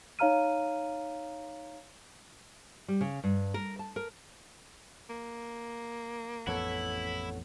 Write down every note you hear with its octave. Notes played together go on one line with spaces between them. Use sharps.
D#4 C#5 F5 A#5 F6 D#7
G3
C#3
G2
A#4
A5
A#4
A#3
A1 F2 B3 E4 A4 C#5 F#5